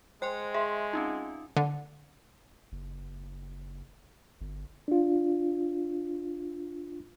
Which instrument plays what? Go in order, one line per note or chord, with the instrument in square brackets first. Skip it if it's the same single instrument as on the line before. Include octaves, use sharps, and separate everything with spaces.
[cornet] G#3 [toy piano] C5 [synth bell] G5 G#5 C6
[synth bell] G#4 [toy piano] E5 C6
[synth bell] C4 C#4 F4 [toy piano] D#4
[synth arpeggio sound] D3
[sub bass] F#1
G1
[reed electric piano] D4 F4